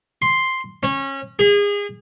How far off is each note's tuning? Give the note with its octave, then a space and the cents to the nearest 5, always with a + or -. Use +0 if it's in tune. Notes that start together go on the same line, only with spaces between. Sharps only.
C6 +0
C#4 -25
G#4 -30